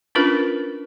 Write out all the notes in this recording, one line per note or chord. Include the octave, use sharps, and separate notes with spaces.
C#4 D4 F4 A#4 B4